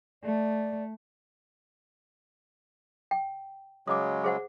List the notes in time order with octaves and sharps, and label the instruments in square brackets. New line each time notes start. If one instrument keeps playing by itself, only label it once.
[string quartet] A3 [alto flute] D5
[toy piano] G5
[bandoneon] C#3 F#3 G#3 [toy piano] D6 D#6
[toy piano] G#4 C5 F#5